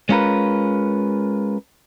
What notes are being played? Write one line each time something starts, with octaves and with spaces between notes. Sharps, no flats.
G#3 C#4 F4 A#4 B4